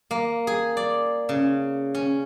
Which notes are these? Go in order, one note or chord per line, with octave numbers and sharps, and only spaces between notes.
A#3
G#4
D5
C#3
C#4